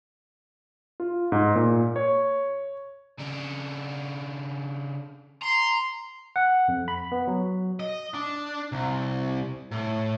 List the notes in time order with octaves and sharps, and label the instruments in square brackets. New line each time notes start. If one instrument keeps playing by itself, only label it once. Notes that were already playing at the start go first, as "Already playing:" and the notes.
[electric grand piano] F4
G#2
A#2
C#5
[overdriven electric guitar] C#3 D4
[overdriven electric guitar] A#5 [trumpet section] C6
[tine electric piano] F#5
F2
B5
B3
F#3
[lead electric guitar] D#5
D4
C2
A2